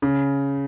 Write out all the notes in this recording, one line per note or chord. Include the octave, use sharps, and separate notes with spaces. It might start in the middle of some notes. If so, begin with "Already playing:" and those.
C#3